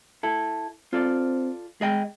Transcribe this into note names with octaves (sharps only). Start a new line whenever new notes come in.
E4 A4
C4 F4 A4 D5
G#3 G#4 D#5 G5